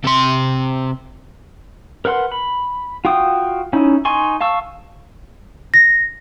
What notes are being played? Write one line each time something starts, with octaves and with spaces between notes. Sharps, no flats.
C3 C6
A#4 B4 F#5 C6
B5
F4 F#4 G5 D#6
C#4 D#4 E4
D#4 G#5 C6 C#6
F5 A5 C#6 E6
A#6